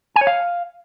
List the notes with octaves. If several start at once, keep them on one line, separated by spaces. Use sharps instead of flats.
G#5
C#5
F5